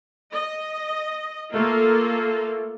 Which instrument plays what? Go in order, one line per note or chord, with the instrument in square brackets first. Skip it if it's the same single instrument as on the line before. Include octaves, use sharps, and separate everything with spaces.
[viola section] D#5
[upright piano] A3 [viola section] A#3 F4 A4